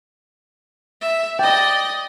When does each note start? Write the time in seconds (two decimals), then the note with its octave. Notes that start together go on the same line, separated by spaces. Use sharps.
1.01 E5
1.39 D5 D#5 G5